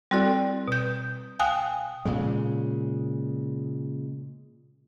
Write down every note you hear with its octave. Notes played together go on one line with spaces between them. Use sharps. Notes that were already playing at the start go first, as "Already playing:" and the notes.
G3 C4 E4 F#4 A4 D5
B2 G6
F5 G5 G#5 D#6 F#6
A#2 C#3 G#3